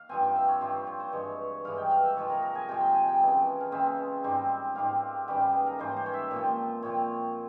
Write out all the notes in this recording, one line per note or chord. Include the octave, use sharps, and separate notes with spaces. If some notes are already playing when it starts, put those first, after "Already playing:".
Already playing: F5
G2 F3 C4 G#5
G5
E5
C#5
G2 F3 C4 E5
C#5
C5
G2 E3 G#3 C#5
G2 E3 G#3 F5
G5
F5
E5
C3 F3 G#3 C#5
A#4
A#4
G#5
C3 F3 G#3 G5
G5
G#5
G5
C#3 E3 G#3 C4
F5
C#3 E3 G#3 C4 E5
G#2 G3 C4
G#2 G3 C4 F5
G#2 E3 G3 C#4 G5
F5
G#4
A#4
G#2 E3 G3 C#4 C5
C5
C#5
E5
A#2 F3 C4
A#2 F3 C4 C#5